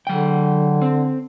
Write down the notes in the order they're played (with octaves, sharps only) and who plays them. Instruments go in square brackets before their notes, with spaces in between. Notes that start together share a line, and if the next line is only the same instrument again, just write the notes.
[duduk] D3 [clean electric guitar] F#3 G5
[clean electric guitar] C4